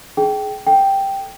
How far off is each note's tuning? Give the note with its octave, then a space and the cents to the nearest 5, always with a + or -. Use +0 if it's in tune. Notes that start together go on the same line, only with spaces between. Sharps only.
D#4 +0 G#4 +20 G5 -10
A4 +0 G5 +0